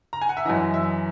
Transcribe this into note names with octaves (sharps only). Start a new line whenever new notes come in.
A#5
G#5
F#5
E5
F#2 E3 D#5
E5